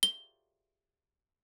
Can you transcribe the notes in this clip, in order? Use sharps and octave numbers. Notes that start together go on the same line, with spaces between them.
G7